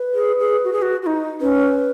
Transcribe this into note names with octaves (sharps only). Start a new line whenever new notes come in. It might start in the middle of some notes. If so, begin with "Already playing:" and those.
Already playing: B4
G#4
G#4
F#4
G#4
F#4
F#4
D#4
C#4 B4